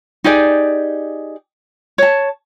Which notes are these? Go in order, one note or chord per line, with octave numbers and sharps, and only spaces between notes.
D#4 G4 G#4 D5
C#5 A5